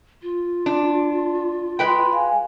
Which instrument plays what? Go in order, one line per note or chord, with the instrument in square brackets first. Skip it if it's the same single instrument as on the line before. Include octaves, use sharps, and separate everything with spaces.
[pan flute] F4
[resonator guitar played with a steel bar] D4
[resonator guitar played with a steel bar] G#3 B4 G5 [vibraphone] B5 C6
[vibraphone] F5 G#5